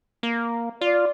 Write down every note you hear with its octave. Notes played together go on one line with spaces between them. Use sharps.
A#3
F4 D5